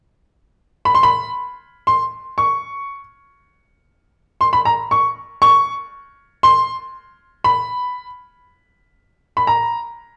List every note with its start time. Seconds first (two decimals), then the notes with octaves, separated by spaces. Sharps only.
0.85 B5
0.95 C6
1.03 B5
1.87 C6
2.38 C#6
4.41 C6
4.53 B5
4.65 A#5
4.91 C#6
5.42 C#6
6.43 C6
7.44 B5
9.37 B5
9.47 A#5